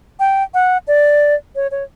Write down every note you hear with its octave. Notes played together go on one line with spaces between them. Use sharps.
G5
F#5
D5
C#5
C#5